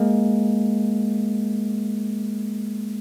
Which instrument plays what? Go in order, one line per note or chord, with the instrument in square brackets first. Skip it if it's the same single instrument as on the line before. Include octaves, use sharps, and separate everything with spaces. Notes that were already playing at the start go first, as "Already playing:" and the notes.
Already playing: [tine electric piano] G#3 A#3